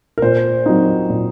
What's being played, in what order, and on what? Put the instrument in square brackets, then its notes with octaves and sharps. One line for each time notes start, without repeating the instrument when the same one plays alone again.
[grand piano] A#4
[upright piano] A#2 [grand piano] C5
[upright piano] F#3 C4 D#4
A#2